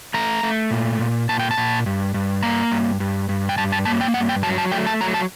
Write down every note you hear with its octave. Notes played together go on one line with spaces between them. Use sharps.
A3 A#5
A3
A#2
A#2
A#2 A5
G5
A5
A#2
G2
G2
A#3 A#5
G2
G2
G2
G5
G2 A5
A5
A#3 A5
G5
G2 F#5
G5
F#3 A5
A5
A3 G5
A5
F#3 A#5
A5